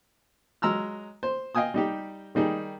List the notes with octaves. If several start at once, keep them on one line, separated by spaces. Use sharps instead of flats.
F#3 G#3 A#5 E6 F6
C5
D#5 F5 G5 G#5 D#6
G3 D#4 G4
D#3 G3 D#4 G#4